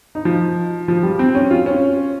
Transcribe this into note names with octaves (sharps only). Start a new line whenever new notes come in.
D#4
F3
F3
G3
C4
C#4
F4
C#4